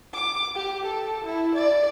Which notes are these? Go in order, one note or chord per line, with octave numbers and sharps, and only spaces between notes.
D6
G4
A4
E4
D5